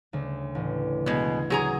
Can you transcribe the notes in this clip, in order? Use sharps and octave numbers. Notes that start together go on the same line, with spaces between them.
D2 C#3
A1
B2 G#3
F#3 G#4 A#5